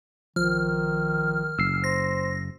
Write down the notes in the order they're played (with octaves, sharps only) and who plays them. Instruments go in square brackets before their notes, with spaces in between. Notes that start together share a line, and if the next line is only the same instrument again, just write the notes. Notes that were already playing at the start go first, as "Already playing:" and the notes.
[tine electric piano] B1 F3 [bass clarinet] D#3 [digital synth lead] F6
[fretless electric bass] F#1 [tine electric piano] E6 C7
[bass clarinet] C5 [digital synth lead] A#6